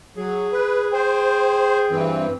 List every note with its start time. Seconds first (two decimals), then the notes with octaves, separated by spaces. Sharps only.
0.17 F#3 G#4
0.52 B4
0.93 C5 G5
1.91 G2 E3 C4